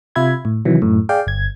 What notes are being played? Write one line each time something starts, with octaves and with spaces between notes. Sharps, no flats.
C3 F4 E5 B5 G#6
A2
C3 D#3 E3 F#3
F#2 A2
G#4 D5 F5 G5
G1 G#6